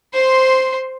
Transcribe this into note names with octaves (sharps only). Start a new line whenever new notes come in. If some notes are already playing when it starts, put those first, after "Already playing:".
C5 C6